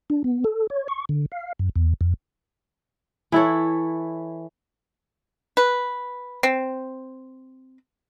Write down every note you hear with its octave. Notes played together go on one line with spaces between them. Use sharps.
D4
B3
A4
C#5
C#6
D3
F5
F#2
E2
F2
E3 E4 A4 C#5
B4
C4